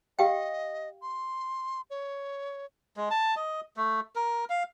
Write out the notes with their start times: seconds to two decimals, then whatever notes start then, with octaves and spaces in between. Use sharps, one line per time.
0.19 G4 D#5 F5 G5
1.02 C6
1.90 C#5
2.97 G#3
3.11 A5
3.36 D#5
3.77 A3
4.16 A#4
4.50 F5